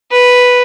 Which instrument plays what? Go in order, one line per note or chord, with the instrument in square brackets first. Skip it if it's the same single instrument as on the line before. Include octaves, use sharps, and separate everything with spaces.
[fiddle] B4